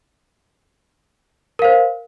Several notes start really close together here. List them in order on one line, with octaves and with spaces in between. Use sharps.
A#4 F5 C5